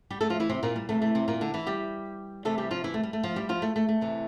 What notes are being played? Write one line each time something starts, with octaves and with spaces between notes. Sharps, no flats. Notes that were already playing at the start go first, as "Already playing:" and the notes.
G3 G4
A3 A4
F3 F4
E3 E4
C3 C4
A#2 A#3
G3
C3 E3 A3
A3
C3 C4
A#2 A#3
D3 D4
E3 E4
G3 G4
C3 E3 A3 A4
G3 G4
F3 F4
E3 E4
A3
G3
A3
F3 F4
G3 G4
F3 F4
A3
A3
A3
C3 E3